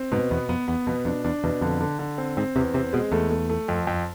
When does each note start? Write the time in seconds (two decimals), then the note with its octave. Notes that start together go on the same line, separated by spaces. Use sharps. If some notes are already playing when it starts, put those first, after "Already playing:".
Already playing: C4
0.12 G#2 B2
0.31 E2 B3
0.49 F2 B3
0.68 E2 B3
0.87 F2 B2
1.05 F2 D4
1.24 E2 D4
1.44 E2 B2
1.61 F2 D3
1.80 D3
1.99 D3
2.18 C4
2.37 G#2 C4
2.56 E2 C3
2.74 C3 C4
2.93 B2 G#3
3.12 E2 A3
3.30 A3
3.49 A3
3.68 F2
3.87 F2